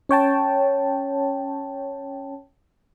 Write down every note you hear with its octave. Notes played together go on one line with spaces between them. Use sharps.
C#4 C#5 G5 A5